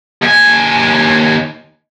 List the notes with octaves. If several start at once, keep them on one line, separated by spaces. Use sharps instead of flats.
D#2 G#5